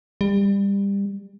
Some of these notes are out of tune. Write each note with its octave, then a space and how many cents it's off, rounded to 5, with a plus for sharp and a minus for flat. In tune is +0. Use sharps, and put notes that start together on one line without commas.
G3 +25